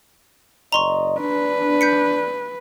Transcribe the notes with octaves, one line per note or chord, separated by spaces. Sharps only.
F#1 D5 D#5 A#5 C6 C#6
D4 B4
G6 B6 C#7